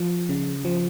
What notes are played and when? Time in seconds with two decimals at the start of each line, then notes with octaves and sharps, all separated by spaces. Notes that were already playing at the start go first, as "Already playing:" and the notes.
Already playing: F3
0.29 C#3
0.65 F3